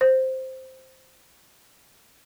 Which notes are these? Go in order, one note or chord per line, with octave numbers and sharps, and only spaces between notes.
C5